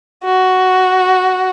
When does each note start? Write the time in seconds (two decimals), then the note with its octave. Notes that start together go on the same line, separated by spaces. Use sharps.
0.24 F#4